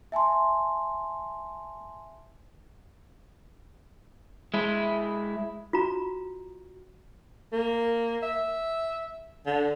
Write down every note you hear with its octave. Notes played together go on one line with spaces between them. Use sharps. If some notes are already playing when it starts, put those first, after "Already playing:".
E5 G#5 A5 C6
G#3 E4
F4 F#4 A#5
A#3
E5
D3